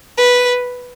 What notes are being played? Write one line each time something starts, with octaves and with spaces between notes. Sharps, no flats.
B4